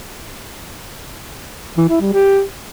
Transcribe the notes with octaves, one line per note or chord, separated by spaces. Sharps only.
E3
E4
G3
G4